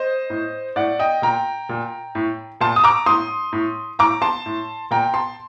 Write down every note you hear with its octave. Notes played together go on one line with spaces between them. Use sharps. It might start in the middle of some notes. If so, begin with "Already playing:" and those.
Already playing: C5 D#5
A2
A2 D5 F#5
D#5 G5
A#2 G5 A#5
A#2
A2
A#2 A5 C6
D#6
A#5 D6
A2 C6 D#6
A2
A2 A#5 D6
A5 C6
A2
A#2 G5 A#5
A5 C6